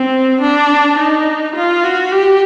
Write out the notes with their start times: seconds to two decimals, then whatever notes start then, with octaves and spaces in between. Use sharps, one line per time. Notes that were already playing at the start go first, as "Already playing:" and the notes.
Already playing: C4
0.41 D4
0.98 D#4
1.55 F4
1.84 F#4
2.12 G4